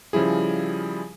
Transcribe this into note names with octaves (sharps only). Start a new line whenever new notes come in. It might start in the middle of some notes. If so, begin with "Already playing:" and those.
C#3 F3 G3 E4 G#4